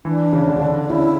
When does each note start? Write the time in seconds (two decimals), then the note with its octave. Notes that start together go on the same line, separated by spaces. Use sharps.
0.05 E3 D4
0.33 C#3
0.48 D3
0.56 C#3
0.61 D3
0.79 D4
0.90 C#3 E4